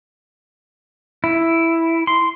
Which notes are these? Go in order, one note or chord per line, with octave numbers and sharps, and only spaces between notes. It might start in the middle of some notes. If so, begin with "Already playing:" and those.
E4
C6